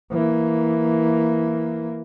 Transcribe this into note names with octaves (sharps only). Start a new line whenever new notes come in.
E3 A#3